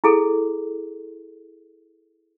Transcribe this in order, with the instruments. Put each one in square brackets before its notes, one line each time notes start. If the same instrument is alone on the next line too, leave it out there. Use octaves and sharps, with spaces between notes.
[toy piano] E4 G#4 A4